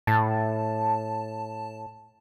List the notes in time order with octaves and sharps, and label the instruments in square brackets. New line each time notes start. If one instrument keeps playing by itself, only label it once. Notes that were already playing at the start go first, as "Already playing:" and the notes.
[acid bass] A2 [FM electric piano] A5